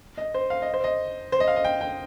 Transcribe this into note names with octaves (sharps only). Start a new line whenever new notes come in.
D#5
C5
F5
D#5
C5
D#5
C5
D#5
F5
D#5
G5
G5